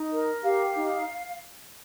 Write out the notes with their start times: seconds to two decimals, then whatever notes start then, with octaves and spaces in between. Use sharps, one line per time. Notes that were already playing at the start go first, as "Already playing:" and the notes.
Already playing: D#4
0.11 A#4
0.43 G4 F5
0.76 D#4